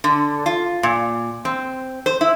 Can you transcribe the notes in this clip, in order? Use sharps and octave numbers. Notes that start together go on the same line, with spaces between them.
D3
F4
A#2
C4
C5
E4